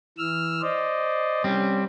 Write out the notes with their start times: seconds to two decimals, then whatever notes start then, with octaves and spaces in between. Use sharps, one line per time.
0.18 E3 E6 F6
0.62 C5 D5 D#5
1.44 G3 C4 C#4